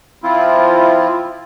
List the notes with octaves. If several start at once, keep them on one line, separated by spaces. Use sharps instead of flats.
F3 C4 E4 F4